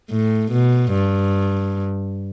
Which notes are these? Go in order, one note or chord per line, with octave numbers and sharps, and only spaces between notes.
A2
B2
G2